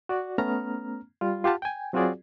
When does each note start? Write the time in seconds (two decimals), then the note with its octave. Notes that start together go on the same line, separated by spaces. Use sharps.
0.09 F#4 D5
0.38 A3 B3 C#4 A#5 F6
1.21 G3 F4
1.44 F4 G4 F#5 A5
1.62 G5 G#5
1.93 F#3 C4 F4 F#4 G#4 D5